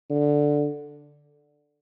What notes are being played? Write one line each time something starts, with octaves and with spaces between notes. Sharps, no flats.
D3